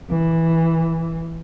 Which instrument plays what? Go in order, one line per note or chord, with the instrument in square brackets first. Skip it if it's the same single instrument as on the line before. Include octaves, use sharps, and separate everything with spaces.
[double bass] E3